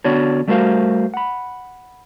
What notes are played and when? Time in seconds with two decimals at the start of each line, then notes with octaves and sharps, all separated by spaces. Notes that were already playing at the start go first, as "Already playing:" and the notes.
0.04 D3 B3 D4 F#4 C#5 D5
0.48 G3 A3 F#4 A#4 C5 F5
1.14 F#5 B5